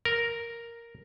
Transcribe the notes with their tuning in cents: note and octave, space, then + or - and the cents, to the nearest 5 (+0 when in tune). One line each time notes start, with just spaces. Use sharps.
A#4 +0